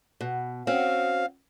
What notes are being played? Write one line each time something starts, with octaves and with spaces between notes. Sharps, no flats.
B2
C4 C#4 F#4 F5